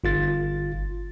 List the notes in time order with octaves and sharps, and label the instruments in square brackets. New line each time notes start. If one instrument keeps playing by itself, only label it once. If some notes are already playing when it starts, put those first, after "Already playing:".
[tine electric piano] G1 F4 A6